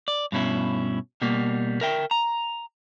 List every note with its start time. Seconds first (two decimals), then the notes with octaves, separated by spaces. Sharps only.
0.08 D5
0.32 G2 B2 C#4 E4
1.22 B2 G3 A#3
1.81 A#4 E5 G5
2.11 A#5